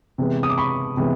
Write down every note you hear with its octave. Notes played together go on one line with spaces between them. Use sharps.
C3 E3 G#3 B3
D#6
D6
B5 C#6
C3 E3 G#3 B3